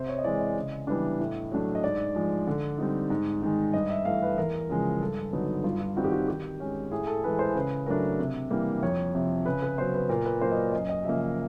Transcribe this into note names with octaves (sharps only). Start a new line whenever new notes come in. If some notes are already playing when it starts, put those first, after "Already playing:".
Already playing: C3 C5
C#5
D#5
E3 G#3 D5
D#5
C#3
E3 G3 B3 D4
A2
F#3 A3 D4
D#5
G#2 D5
F3 G#3
D3
G3 C4 D#4
G#2
D#3 G#3
G2 D#5
E5
E3 A3 F5
B4
E2 A#4
C#3 F3 G#3
G2 A4
D3 F#3 B3 D#4
G2 F4
F4
D#3 G3 C4 D#4 F#4
G4
F#4
D#3 G4
G#3 C#4
A2 G#4
A4
E3 G#3 B4
C5
C#3 B4
F#3 A3 D4 A#4
C3
E3 G3 A#3
F2 C#5
C3 F3
C#3 B4
B4
F#3 B3 C5
B4
A#2 A#4
B4
F#3 A#3 C5
D#5
D5
F#2 D#5
D#5
C#3 F3 A#3 E5
E5